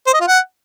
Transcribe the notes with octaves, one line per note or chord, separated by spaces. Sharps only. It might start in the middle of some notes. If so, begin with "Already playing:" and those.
C5
D#5
F4
F#5